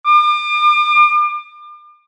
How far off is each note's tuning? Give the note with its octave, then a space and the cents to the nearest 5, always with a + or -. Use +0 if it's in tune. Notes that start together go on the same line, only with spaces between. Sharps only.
D6 +40